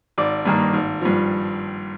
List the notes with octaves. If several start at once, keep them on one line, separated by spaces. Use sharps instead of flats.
G#1 D5
G2 D#3 A#3
G#1
G2 F3